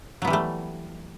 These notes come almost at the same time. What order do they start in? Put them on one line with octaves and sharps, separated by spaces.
F#3 B3 E3 G3 A3